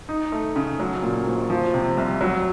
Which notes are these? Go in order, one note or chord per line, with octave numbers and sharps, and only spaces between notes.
D#4
A3
C#3
F#3
A#2
A#1
F3
C3
C2
F#3